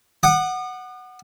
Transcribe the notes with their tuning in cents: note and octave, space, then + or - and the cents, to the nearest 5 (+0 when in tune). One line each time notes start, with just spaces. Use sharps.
F#5 +0 D#6 -45